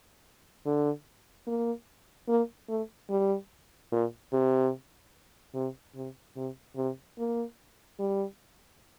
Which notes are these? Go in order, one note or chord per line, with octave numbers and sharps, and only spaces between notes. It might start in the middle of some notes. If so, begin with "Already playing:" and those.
D3
A#3
A#3
A3
G3
A#2
C3
C3
C3
C3
C3
A#3
G3